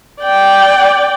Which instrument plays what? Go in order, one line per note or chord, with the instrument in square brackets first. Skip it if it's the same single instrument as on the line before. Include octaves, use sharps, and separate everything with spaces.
[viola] D5 G5